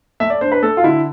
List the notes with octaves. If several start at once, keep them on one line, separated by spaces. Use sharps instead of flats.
A3 E5
D5
D4 C5
B4
A3 A4
F4
D3 E4